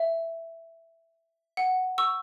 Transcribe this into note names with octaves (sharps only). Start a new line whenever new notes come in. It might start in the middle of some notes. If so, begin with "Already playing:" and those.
Already playing: E5
F#5
C#6 E6